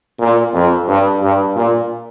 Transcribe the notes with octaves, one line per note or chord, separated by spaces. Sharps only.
A#2
F2
G2
G2
A#2